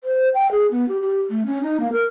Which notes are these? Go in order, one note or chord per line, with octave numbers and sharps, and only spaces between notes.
C5
G5
G#4
B3
G4
G4
A3
C#4
D#4
A#3
A#4